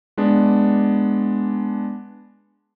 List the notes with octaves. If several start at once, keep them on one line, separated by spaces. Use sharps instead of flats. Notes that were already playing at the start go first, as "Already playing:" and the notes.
G#3 B3 D4